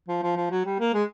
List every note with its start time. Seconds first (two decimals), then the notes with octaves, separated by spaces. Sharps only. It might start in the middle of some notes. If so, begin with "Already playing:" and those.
0.08 F3
0.23 F3
0.36 F3
0.51 F#3
0.65 G3
0.79 A#3
0.93 G#3